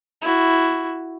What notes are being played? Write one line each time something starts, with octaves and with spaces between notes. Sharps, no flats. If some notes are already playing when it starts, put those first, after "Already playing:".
E4 F#4